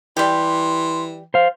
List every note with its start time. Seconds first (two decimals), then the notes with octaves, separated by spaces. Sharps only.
0.17 E3 G3 G4 C6
1.34 C5 F5